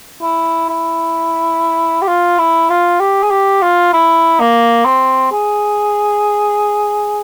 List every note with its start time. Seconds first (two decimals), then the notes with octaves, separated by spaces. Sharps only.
0.22 E4
0.69 E4
2.02 G4
2.08 F4
2.38 E4
2.70 F4
3.00 G4
3.23 G#4
3.31 G4
3.62 F4
3.93 E4
4.40 A#3
4.85 C4
5.32 G#4